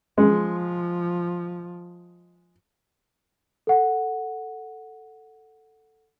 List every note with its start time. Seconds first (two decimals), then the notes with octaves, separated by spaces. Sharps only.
0.18 F3 G#3
3.67 A4 F#5